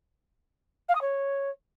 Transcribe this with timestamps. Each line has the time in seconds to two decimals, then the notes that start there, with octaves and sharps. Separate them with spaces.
0.89 F5
0.95 D#6
1.01 C#5